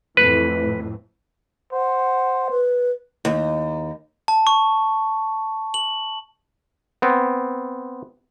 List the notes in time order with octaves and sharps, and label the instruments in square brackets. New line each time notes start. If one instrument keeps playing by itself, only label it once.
[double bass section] F2 A2 E3 [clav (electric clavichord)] B4
[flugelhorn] C5 [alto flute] F#5
[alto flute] B4
[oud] D#2
[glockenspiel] A5
C#6
F#7
[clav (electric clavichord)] B3 C4